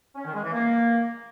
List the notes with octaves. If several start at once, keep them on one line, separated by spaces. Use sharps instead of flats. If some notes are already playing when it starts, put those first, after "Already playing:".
C#4
D#3
G#3
E3
A#3